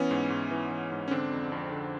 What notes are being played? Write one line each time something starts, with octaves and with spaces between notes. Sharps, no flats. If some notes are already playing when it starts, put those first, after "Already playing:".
Already playing: E3 B3 C#4
G#2
G#2
E3
E3
G#2
C#4
D3 C4 D4
F2
F2
D3